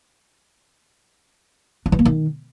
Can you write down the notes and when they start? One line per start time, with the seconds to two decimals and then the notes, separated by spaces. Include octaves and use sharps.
1.86 D4
1.92 E3
1.99 A#3
2.05 D#3